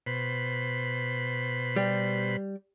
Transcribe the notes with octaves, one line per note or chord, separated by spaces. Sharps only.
B2 B4 C5
G3